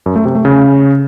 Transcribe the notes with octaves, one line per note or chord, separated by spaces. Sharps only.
F#2
A3
C3
A3
C#3